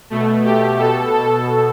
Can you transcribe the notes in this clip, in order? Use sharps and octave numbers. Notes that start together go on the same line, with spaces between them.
B2 A3
G4
B2 A4
A4